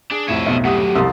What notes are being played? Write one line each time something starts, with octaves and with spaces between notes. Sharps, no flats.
D4 G#4
C2 F2 A2 C#5 E5
B1 B2
F#3 A3 G4 F#5 D#6
C2 F2 C6 D#6 E6